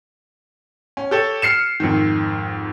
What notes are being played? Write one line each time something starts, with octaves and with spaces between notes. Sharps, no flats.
C#4
G4 A4 C#5
F6 C7 C#7 E7
F2 G#2 D#3